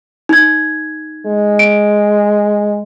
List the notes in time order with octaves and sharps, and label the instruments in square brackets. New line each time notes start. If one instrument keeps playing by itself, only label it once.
[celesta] D#4 G#6
[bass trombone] G#3
[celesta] D7